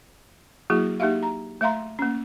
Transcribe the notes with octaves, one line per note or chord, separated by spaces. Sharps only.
F#3 A#3 E4 F#4 G#4
A#3 D#4 G4 E5 F5
A#5
A3 E5 F5 A#5 C6
A#3 C#4